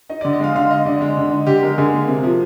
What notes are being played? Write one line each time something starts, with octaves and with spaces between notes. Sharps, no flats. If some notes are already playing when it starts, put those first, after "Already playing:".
D#4 D#5
D3 D5
D#5
G#3 F5
D3 F5
D#4 D#5
D3 D5
G#3
D3
D#4
D3 G4
G#3 A#4
D3 G#4
A#3
C3
F3